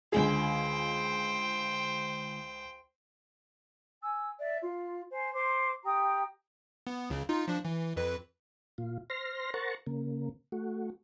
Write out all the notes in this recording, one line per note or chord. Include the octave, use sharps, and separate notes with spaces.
C#2 D3 G#3 F4 G#4 C5 G5
G#5 E6
D5 E5
F4
C5 G#5
C5 C6 D6
G4 G5 A#5 D#6
B3
C#2 C#3
D#4 F4
F3 D4
E3
F2 B4
A#2 F4
C5 C6 F6 A#6
A#4 C5 F#5 A5 A#5 C#6
C#3 A#3
A3 F#4